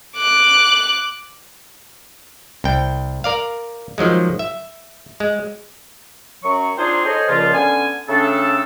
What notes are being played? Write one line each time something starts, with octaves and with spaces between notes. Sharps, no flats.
D6 F#6
C2 G5
A#4 D5 F5
D#3 F3 F#3 G#3
E5
G#3
F#2 F#3 C#6
C4 D4 D#4 F4 G#4 C5
G#4 A4 C5 C#5 D#5 G#5
C#2 A#2 C#3 F3 F4
D3 B3 C#4 G#5
C#3 A3 C4 D4 A4